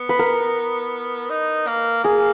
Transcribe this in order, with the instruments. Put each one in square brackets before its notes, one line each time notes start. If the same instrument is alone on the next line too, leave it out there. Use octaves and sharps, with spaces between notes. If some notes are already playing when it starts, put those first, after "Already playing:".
Already playing: [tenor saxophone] B3
[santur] B4
A#4
[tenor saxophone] D#4
A#3
[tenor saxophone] A#3 [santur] G#4